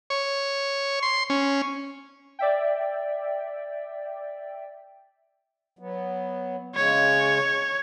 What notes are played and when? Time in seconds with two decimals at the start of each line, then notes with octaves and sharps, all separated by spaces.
0.10 C#5
1.02 C6
1.30 C#4
2.39 D5 E5 G5
5.79 F#3 B3
6.75 C#3 G#3 C#5